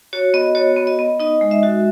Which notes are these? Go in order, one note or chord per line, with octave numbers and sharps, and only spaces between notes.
F#4 C#5
B3 D#5
F#4 C#5
B3
D#5
B3
D#4 D#5
G#3
E5
F#4